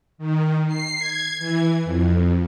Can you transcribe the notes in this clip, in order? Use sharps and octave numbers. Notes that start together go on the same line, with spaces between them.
D#3
C7
G#6
E3
F2